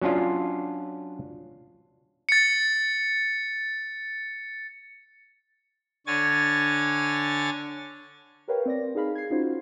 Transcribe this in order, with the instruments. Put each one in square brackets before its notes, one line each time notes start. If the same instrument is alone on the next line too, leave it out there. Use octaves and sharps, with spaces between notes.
[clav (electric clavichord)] F#3 C#4 D4 F4
[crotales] A6 C#7
[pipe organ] D3 C#5 G#5 A6
[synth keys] G4 A#4 B4 C#5 F5 G5
C4 D5 A#6
D#4 G#4 F5 B5
G#6 C7
C#4 D#4 F4 F#4 C5